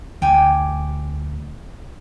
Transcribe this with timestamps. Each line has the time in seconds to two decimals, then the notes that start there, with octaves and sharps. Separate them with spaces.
0.22 D2 G5 G#5 D6